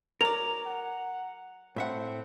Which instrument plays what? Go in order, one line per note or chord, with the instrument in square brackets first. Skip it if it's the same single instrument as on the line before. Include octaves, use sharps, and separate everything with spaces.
[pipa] F#3 D5 [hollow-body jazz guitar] A#4 [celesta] F7
[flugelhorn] F#5
[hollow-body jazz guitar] A2 E5 F#5 [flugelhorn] C4